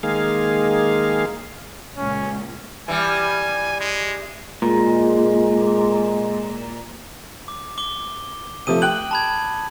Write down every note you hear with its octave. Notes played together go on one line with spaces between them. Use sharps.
D#3 G#3 A#3 G#4 F5
C#2 A#2 C#4
E3 G3 G#5
G#3
A#2 G#3
D6
D6 G7
C3 F3 A3 D#6 D#7
G5 F#6 F#7
A5 B5 G#6